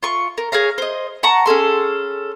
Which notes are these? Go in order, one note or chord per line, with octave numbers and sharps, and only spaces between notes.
F4 C#6
A#4
G#4 C#5 F5 A#5
C5 D#5
F#5 A5 A#5 C#6
C#4 G#4 A4 C6